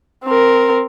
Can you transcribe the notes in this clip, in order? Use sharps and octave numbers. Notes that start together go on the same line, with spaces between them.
C4 A#4